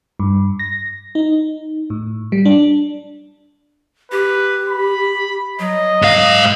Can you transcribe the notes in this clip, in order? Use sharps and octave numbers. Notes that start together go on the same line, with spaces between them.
G2
A#6
D#4
A2
G3
D4
G4 B4
B5
F#3 D#5
G#2 F5